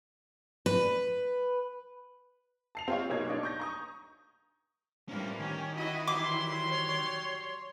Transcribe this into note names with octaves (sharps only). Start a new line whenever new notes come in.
B4
A5 C7 F7
C4 F4 C#5
F#1 B2 A#3 D#4 C#5 G#6
D4 D#4
C#6 G6 A#6
A#5 C#6 D#6
A2 E3 F3 G3 A#3 C#4 D4
D#3 C#4 G4
E4 F#4 D#5
E3 F#3 G3 E4 C6 D6
C#5